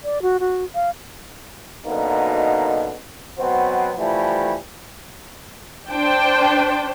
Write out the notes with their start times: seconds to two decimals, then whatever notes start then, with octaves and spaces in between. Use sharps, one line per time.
0.04 D5
0.22 F#4
0.40 F#4
0.75 F5
1.86 F#2 B2 D3 A#3 D#4
3.38 B2 F#3 B3 C4 F#4 C5
3.97 E3 F3 G3 A3
5.91 D4 C5 G5 A5